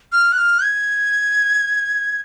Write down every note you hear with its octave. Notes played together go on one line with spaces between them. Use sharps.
F6
F#6
F6
G#6